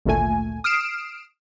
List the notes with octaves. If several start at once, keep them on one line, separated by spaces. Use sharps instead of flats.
G#1 D2 A#2 A3 G#5
D#6 F6 C7 D7 E7